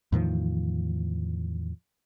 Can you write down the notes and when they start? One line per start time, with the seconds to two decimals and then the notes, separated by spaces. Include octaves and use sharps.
0.12 E2 A2 D#3 F3